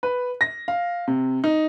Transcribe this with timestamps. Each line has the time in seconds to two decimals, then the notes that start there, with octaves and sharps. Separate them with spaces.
0.03 B4
0.41 A#6
0.68 F5
1.07 C3
1.44 D#4